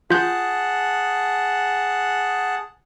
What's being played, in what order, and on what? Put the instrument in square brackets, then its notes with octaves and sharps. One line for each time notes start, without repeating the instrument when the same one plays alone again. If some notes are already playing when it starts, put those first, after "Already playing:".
[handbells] F4 G6 [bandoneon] G#4 F#5 A5